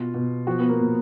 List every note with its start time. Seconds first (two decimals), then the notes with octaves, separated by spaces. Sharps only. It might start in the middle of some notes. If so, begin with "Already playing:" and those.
Already playing: B2 F4
0.14 B2
0.47 F3 F#4
0.59 B3
0.69 A#3
0.80 A#2